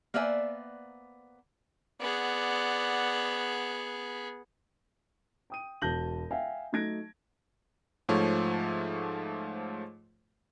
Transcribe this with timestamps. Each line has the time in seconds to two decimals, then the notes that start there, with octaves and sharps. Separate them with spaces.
0.14 A#3 B3 C5 D5 E5 G#5
2.00 B3 G#4 D5 F#5
5.50 G5 D#6 D#7
5.82 E1 F#4 A5 G6 A#6 F#7
6.31 E5 F5 G5 G#5
6.72 F#3 A3 D#4 G#6 A#6 D7
8.09 G#2 F3 A3 C#5